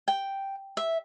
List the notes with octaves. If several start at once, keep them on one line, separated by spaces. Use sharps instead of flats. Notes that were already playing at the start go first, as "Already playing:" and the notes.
G5
E5